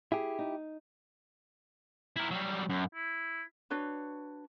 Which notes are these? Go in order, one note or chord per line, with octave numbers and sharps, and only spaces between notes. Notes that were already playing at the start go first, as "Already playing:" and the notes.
E4 G4 G#4
D#4
E4 A#4
F#3 G3
F#2
E4
D4 F#4 B4 C#5